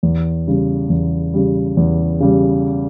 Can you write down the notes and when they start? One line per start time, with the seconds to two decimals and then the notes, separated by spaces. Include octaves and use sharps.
0.03 E2
0.47 C#3 G3
0.90 E2
1.34 C#3 G3
1.77 E2
2.20 C#3 G3